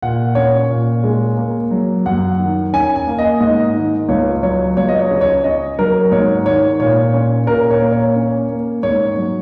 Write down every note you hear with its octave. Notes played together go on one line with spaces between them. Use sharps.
A#2 F#5
C#4 C#5
A#2
G#3
A#3
F#3
F#2 F#5
D#3
C#4 G#5
G#5
A#3
D#5
G#2 D#5
D#3
C#2 C#5
F#3 C#5
C#2 C#5
D#5
C#5
C#3
C#5
C#4 D#5
F#3 A#4
G#2 C#5
D#3 C#5
A#2 C#5
C#4 C#5
A#2 A#4
C#5
A#3
C#5
C#4
A#3
G#2 C#5
F#3